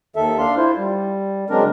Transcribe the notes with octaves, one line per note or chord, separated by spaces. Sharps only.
D#2 D#3 A4 E5
D4 F5 C6
E4 F4 C5
G3
C#3 F#3 G#3 C4 D4 A#4